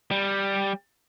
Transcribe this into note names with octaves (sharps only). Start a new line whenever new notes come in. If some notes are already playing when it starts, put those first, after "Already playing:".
G3